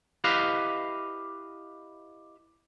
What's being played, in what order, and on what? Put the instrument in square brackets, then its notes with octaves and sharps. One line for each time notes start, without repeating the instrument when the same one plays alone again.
[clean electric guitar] E4 G4 B4 D#5 F5